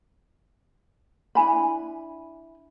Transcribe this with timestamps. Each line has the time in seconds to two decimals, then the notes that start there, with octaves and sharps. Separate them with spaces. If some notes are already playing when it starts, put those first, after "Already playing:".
1.35 D4 E4 G#5 B5